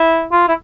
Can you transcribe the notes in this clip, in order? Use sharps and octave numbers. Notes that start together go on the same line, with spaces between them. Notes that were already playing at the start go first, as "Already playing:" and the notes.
Already playing: E4
F4
E4